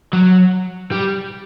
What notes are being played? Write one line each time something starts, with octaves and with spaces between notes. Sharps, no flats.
F#3
G3